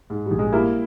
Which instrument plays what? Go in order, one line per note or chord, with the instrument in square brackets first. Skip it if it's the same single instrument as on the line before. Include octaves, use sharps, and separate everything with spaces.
[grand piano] G#2
[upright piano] G3
[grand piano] A#1
[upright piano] G#3
[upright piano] G3 A#3 [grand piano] E4